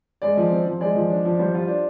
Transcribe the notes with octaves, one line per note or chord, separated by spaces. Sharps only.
G#3 D5
F3
C4
F3
G#3 D5
F3
D4
F3
G3 C5
F4
D4